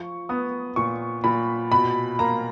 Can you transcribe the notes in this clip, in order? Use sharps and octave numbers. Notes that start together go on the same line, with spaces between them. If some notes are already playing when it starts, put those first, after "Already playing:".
Already playing: F3 C#6
B3 D#6
A#2 C#6
A#2 B5
B2 B5
A#3 A#5